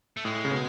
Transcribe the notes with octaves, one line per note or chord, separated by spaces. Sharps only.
A3
A2 G#3
C#3
B2